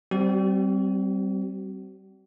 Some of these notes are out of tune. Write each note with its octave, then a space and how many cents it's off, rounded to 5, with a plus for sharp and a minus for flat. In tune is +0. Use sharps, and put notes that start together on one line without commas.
G3 -20 C4 +0 F#4 +45